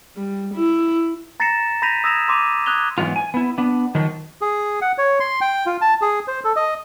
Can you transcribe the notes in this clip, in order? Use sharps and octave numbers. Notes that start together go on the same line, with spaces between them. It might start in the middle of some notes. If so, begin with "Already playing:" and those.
G3
E4
A#5 A6 A#6 C7 C#7 E7
B5 G6 A#6 B6 D#7 F7
D#6 E6 G#6 A#6 E7 F7
C6 D6 D#7 F7
D#6 F#6 G#6 F7 G7
G#2 E3 F#3 G#3 B3 F4
G#5
B3 E4
B3 D4
D#3 F3 F#3
G#4
F#5
C#5
C6
G5
F4
A5
G#4
C5
A4
D#5